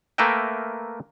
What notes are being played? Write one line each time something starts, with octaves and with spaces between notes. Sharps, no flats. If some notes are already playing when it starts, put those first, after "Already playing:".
A3 A#3 A#4 B4 E5 G5